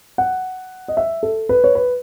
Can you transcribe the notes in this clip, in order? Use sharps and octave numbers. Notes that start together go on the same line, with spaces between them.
F#5
D#5
E5
A4
B4
C#5
B4